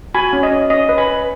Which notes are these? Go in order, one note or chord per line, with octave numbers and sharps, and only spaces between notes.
F#4 G#5 B5
C#4
D#5
C#4
C#4 D#5
B4
G#5 B5
B4